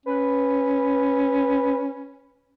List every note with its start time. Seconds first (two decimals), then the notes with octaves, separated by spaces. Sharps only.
0.06 C#4 B4